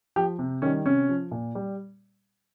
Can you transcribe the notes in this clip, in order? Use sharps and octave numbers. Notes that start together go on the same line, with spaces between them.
F3 G4
C3
D#3 G3 C#4
C3 C#4
F3
A#2
G3